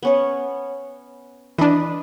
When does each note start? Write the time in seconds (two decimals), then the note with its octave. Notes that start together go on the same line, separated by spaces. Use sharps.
0.03 B3 C#4 C#5
1.58 E3 D4 B4 D#5